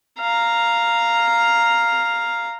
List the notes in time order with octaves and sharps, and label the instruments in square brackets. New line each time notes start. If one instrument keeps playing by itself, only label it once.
[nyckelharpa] F5 A#5